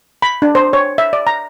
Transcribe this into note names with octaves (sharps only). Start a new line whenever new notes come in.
B5
D4
C5
C#5
E5
D5
A#5